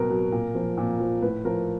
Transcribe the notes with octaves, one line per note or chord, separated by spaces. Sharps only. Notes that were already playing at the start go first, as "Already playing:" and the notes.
Already playing: B2 F#3 A#4 B4
F#3
A#2
F3
A#2
F3
A2 B4
F3 A#4